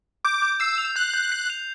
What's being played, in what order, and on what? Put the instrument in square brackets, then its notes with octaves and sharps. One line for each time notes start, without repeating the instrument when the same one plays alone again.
[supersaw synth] D6 [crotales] G6
[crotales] G6
[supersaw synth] E6 [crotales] C7
[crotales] F7
[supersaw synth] F#6 [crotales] G6
[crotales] G6
C7
F7